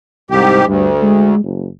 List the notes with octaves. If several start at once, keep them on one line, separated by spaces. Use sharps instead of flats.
C2 G#2 G4
D2 G2
G#3
F#1